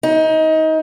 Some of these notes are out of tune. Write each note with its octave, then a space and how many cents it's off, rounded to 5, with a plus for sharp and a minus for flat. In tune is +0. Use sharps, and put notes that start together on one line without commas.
D#4 +25